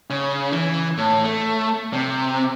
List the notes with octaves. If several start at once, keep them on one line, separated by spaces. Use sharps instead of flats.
C#3
E3
A2
A3
C3